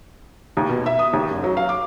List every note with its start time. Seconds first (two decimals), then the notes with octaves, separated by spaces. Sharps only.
0.57 D#2
0.69 B2
0.86 E5
0.99 D#6
1.13 D#2
1.30 F#1
1.44 F#3
1.57 F5
1.69 D6